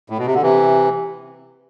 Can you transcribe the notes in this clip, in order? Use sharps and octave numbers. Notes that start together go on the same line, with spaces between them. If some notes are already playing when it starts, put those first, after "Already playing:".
A2
B2
C3
D3
C3 E3